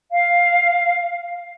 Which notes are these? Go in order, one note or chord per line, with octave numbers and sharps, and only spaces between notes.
F5